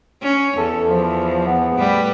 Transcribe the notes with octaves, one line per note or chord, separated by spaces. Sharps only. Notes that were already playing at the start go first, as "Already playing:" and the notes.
C#4
E2 A4
F3
B3
A2 G3 B4